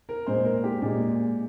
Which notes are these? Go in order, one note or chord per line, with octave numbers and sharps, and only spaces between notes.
A#4
A#2 G#3 C5
A#4
G4
A#2 G#3